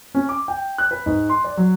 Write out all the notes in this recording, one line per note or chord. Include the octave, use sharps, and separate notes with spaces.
C#4
D6
G5
F#6
B4
G#2
C6
D5
F#3